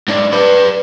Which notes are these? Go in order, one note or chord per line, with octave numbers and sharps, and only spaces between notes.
G#2 D4
B4 D5